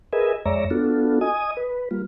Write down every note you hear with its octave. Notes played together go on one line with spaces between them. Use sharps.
G#4 A#4 B4 D#5 E5 G#5
F2 G#3 C#5 D5 E5 A#5
B3 D4 F4 F#4 A4
D#5 G#5 D#6
B4
G3 A#3 F4